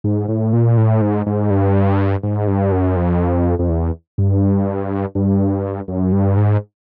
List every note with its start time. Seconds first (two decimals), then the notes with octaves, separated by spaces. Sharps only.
0.04 G#2
0.28 A2
0.53 A#2
0.77 A2
1.02 G#2
1.26 G#2
1.50 G2
2.23 G#2
2.48 G2
2.72 F#2
2.96 F2
3.59 F2
3.69 E2
4.18 G2
5.15 G2
5.88 F#2
6.12 G2
6.37 G#2